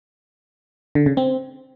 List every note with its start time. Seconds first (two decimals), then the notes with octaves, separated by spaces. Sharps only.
0.95 D3
1.06 C#3
1.17 C4